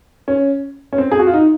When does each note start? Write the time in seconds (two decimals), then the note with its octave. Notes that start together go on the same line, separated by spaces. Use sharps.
0.28 C#4
0.93 C#4
0.98 C4
1.11 G#4
1.19 F#4
1.27 F4
1.34 D#4